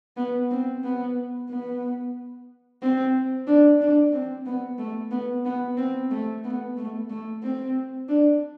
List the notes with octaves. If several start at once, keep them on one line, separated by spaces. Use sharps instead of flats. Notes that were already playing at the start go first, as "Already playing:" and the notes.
B3
C4
B3
B3
C4
D4
D4
C4
B3
A3
B3
B3
C4
A3
B3
A3
A3
C4
D4